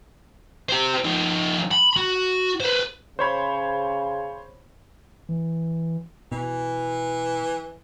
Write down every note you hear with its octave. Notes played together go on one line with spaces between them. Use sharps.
G4 C5
F3 D#4
B5
F#4
B4 C5
C#3 C5 C#5 B5
E3
B2 E3